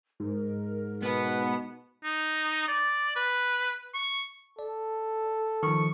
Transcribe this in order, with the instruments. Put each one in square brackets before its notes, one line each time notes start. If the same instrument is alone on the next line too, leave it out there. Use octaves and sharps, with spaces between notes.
[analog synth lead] G#2 [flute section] A#4
[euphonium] B2 [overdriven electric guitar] B3 B4
[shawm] D#4
D5
B4
C#6
[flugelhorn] A4 [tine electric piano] D5
[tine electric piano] D#3 F3 [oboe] C#6